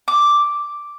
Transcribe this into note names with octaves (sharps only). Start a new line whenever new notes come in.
D6